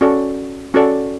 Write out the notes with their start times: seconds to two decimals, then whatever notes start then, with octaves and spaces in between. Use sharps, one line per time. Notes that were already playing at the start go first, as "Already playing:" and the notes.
0.01 C#4 F#4 A4 D5
0.74 C#4 F#4 A4 D5